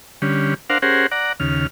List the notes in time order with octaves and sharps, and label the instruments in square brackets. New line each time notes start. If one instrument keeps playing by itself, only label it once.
[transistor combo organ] D3 G3 C#4
D4 A#4 C5 F5 F#5
C#4 G4 G#4 A#4 C5 F#5
D5 F#5 A#5
D#2 C#3 F6